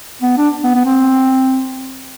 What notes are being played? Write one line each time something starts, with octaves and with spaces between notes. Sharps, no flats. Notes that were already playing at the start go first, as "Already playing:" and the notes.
B3
D4
B3
B3
C4